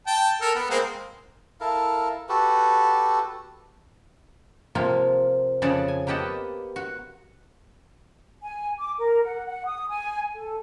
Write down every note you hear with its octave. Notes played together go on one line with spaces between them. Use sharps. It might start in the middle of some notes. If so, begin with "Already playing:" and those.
G5 A5
A4 A#4
B3
G#3 A#3 C4
E4 A4 A#4 F5
F#4 G4 A4 B4
C3 F3 A#3 F4
F2 C#3 G#4 D5 F#5 A5
G#5
A#3 B3 G4 D#5 F#5 A5
F#4
G#5
D6
A#4
F#5
F#5
D#6
G#5
A4